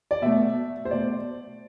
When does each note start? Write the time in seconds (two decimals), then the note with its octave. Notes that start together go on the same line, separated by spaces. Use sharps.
0.11 D5
0.22 B2 A3 E5
0.85 C5
0.90 B2 A3 D5